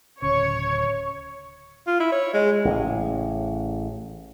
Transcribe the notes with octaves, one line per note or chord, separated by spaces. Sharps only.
D1 C#3 C#5 C#6
F4
E4
C#5
G#3
A1 C#3